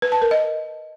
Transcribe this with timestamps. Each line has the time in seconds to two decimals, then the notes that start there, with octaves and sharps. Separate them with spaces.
0.02 B4
0.12 A5
0.22 A#4
0.31 D#5